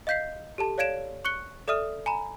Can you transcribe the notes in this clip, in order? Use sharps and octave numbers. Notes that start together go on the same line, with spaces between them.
D#5 F5 G6 B6 C7
G4 A4 A5
C#5 D5 F5 G#6 D7 E7
C#6 F#6 C#7 G7
A4 D5 E5 D#6 F6 D#7
G#5 A#5 B5